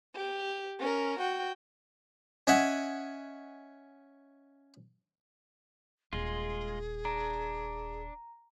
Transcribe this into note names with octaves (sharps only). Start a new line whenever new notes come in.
G4
C#4 A#4
F#4 G5
C#4 D#5 E5 F#5 G#5
D#1 G#3 F4 G#4
D4 A#5